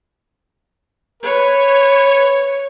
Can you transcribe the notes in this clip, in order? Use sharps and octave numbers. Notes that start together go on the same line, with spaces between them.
B4 C#5